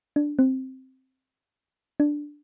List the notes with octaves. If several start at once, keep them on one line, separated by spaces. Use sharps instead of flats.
D4
C4
D4